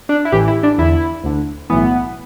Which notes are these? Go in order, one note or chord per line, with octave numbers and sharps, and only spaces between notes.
D4
E4
A1 A2 E3 G4
E4
D4
E2 D3 E4
D2 D3
B1 A2 E3 B3